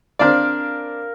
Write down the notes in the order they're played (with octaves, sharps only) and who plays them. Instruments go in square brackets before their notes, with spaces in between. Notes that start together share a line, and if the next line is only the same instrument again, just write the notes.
[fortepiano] C4 D4 D5 [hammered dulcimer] A#4 F5